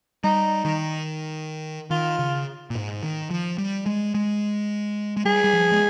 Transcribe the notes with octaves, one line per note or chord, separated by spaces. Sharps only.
G3 D#4
D#3
D#3 F4
C#3
A#2
G#2
D#3
F3
G3
G#3
G#3
G#3
G3 G#4
G3
F3
G#3